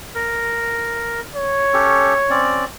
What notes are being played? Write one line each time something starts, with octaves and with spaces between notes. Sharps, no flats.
A#4
C#5
C#4 G4 A4
C4 C#4 D5